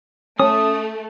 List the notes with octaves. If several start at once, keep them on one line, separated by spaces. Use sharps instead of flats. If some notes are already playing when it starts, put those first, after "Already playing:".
A3 C#4 D#6